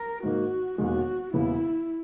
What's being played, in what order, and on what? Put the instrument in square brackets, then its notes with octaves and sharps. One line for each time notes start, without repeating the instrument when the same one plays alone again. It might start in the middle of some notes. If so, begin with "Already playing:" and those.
Already playing: [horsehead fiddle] A#4
[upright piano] G#2 D#3 A#3 [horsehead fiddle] F#4
[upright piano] E1 D#2 D#3 G#3 [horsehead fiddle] F#4
[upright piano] E1 D#2 C#3 E3 B3 [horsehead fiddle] E4